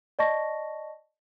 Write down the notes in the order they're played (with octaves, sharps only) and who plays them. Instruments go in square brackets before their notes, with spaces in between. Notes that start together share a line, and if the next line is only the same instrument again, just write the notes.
[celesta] D5 D#5 A5 C#6 A#6